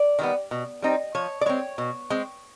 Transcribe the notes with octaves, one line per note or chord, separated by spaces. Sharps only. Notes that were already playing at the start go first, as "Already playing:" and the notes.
Already playing: D5
D#3 G3 B3
B2
G3 C4 D#4
F3 C#5
D5
G#3 C4 C#5
B2
G#3 C4